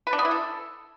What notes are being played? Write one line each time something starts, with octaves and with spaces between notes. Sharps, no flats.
B4
D4
B3
E4
A4